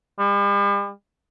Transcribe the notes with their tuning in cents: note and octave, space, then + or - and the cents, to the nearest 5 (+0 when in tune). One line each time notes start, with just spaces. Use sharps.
G3 +45